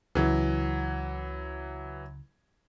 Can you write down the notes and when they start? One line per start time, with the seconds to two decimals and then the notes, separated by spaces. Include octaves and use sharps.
0.15 C#2 C#3 E3 F#3